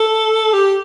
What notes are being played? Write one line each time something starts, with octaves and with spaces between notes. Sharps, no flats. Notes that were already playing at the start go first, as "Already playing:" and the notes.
Already playing: A4
G4